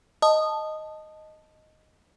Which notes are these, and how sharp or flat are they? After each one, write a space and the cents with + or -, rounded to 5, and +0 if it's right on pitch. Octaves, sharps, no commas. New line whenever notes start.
D#5 +0 A5 +0 D#6 -15